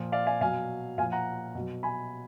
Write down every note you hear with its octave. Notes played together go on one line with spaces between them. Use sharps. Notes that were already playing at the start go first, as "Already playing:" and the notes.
Already playing: A#2 F3
D5 F5
F5 G#5
B2 F#3 F5 G#5
A#2 F3 F5 G#5
F#5 A#5
B2 F#3
G#5 B5